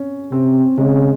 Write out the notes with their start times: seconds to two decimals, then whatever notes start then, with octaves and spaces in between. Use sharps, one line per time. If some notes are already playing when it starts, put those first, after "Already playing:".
Already playing: C#4
0.31 C3 C4
0.78 C#3 G#3